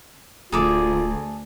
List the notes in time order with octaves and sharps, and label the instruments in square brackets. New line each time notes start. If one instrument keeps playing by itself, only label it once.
[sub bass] D1 [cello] D2 A3 [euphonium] F4 [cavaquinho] G#4 A4 D6